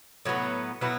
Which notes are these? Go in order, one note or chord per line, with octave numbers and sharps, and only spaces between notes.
A2 F#3 B3
B2 F#3 B3 E4